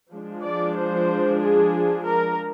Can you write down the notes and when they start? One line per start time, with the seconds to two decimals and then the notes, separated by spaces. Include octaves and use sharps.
0.11 F3 G#3 D4
0.43 D5
0.76 C5
1.41 G#4
2.06 A#4